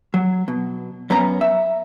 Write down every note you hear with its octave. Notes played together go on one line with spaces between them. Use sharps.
F#3
B2
F#2 B3 C#4 A#5
E5